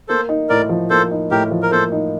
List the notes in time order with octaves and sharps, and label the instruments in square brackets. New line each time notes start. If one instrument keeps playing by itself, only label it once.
[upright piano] A#3 [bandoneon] A4 C5
[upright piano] D#4
[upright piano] A2 [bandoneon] A#4 D5
[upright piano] F3
[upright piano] A#3 [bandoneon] A4 C5
[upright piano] D#4
[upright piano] A2 [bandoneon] G4 A#4
[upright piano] F3
[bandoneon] A#4
[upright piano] A#3 [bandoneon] A4 C5
[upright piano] D#4